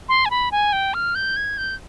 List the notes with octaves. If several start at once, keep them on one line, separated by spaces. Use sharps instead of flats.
C6
G#5
B5
G#5
G5
F6
G6
G#6
G6